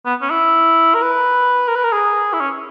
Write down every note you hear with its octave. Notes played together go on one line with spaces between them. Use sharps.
B3
C#4
E4
A#4
B4
A#4
B4
A#4
G#4
E4
C#4